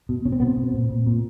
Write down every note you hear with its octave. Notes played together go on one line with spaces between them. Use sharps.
B2
B2 C#4
C4
B2 B3
C4
B2
A#2
A#2
A#2